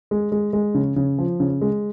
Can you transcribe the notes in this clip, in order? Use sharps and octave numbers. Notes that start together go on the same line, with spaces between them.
G#3
G#3
G#3
C#3
C#3
F3
C#3
G#3